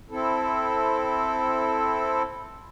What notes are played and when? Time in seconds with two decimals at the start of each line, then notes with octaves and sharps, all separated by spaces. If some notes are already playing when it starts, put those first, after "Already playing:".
0.10 C4 E4 A4